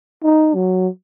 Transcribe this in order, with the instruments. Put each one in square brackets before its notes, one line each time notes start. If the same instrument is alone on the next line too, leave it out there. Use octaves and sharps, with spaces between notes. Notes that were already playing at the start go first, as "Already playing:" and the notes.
[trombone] D#4
F#3